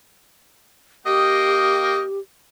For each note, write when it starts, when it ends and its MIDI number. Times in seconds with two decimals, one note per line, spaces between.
1.06 2.00 58
1.06 2.20 67
1.06 2.00 75
1.06 2.00 79